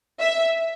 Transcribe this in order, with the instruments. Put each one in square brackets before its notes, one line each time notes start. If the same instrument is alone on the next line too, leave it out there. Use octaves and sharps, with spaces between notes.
[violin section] E5